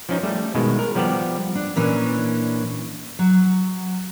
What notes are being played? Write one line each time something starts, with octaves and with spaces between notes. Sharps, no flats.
F3 C#4 D#4
G3 A3
B2 D#3 G#3
A#4
F3 G3 B3 G4 D5
D4
A#2 E3 C#4 D4
F#3